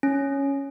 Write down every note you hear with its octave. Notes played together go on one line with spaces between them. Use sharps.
C#4